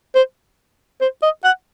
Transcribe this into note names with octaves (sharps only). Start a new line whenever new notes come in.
C5
C5
D#5
F#5